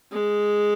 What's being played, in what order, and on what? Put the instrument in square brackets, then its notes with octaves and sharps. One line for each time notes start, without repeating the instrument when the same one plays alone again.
[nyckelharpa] G#3